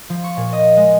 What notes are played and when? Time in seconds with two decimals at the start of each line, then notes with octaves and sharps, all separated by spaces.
0.09 F3
0.24 C#6
0.37 A#2
0.53 D#5
0.77 G#3